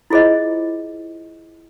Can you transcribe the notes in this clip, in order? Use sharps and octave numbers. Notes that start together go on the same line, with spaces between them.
E4 F4 G#4 C5 D#5